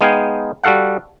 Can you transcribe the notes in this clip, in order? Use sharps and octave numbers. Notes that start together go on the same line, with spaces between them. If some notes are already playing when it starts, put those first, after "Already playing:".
G#3 B3 D#4 F5 G5 G#5
G3 F#4 A4 F5 F#5